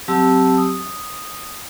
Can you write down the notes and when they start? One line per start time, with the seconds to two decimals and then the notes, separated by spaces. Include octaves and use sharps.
0.08 F#3 C4 G4 A5 E6
0.57 D#6